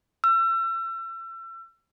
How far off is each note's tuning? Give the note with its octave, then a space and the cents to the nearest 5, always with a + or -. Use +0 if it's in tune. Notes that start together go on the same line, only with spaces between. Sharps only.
E6 +35